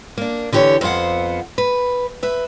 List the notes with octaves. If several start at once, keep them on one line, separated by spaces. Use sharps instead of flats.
A#3 D4
D3 E3 G4 A4 C#5
F2 B3 C5 F5 F#5
B4
B4 E5